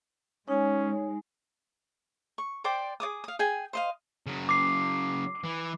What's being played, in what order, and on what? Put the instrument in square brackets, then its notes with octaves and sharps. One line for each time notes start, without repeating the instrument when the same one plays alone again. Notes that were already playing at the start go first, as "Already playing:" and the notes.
[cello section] G#3 [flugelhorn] C#4 [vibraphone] D#4 G#5 [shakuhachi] C#5
[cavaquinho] C#6
C5 D5 G5 D6
G#4 D5 D6 D#6
F5 D#6
G#4 G5 G#5
C5 D#5 F5
[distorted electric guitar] C#3 F#3
[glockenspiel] D6 C7
[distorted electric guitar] E3